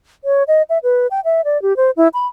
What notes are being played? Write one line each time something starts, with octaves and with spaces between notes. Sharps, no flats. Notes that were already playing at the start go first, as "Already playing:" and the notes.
C#5
D#5
E5
B4
G5
E5
D5
G4
C5
E4
B5